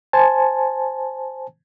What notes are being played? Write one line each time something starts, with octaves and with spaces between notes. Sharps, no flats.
C5 G#5 A5